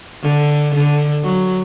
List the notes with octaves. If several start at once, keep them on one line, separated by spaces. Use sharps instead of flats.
D3
D3
F#3